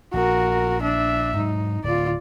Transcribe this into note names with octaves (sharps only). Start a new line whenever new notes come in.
A#1 F#4 A#4
D4 E5
G#2 F#3 D#4
D1 F4 D5